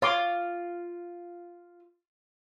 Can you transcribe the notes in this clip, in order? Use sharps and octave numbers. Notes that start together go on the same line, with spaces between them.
F4 C#5 C6 D6